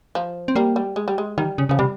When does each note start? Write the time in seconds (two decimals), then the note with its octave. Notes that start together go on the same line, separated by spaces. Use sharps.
0.15 F3
0.48 C4
0.56 G3 A#3
0.76 G3
0.96 G#3
1.08 G3
1.18 G#3
1.38 D#3 G3
1.58 C#3
1.69 C#3 F3
1.79 C3 G3